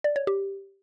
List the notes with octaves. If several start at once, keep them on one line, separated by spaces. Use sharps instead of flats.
D5
C#5
G4